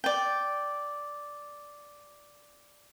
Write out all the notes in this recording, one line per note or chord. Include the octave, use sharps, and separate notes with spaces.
D5 G5